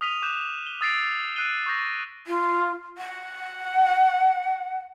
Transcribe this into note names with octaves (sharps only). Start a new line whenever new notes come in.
D#6 F6 B6 D#7 F7
D6 F#6 G6 E7
G7
D#6 E6 A6 B6 C7 D7
E6 F#6 C7 D7 D#7 G7
C#6 D#6 G6 A#6
F4
F#5